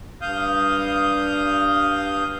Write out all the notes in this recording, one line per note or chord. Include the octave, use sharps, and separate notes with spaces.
G2 F5 D#6 G6